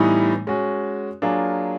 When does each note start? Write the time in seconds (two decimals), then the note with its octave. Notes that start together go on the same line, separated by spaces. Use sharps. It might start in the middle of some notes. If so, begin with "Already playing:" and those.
Already playing: A2 E3 G3 B3 D#4
0.47 G#3 C#4 F#4
1.22 F#3 A#3 D4 F4 G#4